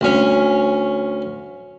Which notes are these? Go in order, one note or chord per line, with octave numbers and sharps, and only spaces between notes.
D2 C#4